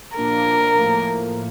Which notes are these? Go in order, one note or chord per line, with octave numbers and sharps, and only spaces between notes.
A#2 F3 A#3 D4 A#4
A2 F3 A#3